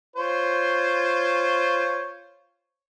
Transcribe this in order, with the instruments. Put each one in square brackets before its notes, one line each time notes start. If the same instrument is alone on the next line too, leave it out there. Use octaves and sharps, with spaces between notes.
[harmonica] F4 C5 C#5